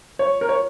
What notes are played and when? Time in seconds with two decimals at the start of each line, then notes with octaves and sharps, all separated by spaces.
0.19 C#5
0.41 A#4
0.49 C#5